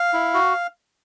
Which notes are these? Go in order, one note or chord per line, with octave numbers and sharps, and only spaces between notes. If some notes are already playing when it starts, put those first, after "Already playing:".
Already playing: F5
E4
F#4